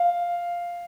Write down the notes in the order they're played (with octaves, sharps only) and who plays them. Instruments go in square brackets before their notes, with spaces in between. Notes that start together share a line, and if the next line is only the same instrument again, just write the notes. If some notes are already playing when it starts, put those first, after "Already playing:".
Already playing: [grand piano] F5